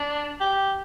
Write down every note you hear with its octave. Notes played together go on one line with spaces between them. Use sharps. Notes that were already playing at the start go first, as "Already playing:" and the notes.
Already playing: D4
G4